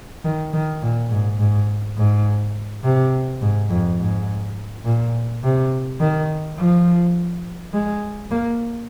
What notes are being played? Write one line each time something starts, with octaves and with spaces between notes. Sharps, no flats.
D#3
D#3
A#2
G#2
G#2
G#2
C3
G#2
F2
G#2
A#2
C3
D#3
F3
G#3
A#3